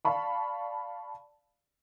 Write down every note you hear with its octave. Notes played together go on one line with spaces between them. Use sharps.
D5 F5 A5 B5 C#6